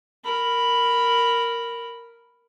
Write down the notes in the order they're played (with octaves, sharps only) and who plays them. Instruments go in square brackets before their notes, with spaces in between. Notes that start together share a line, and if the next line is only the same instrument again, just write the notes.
[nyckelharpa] A#4 B5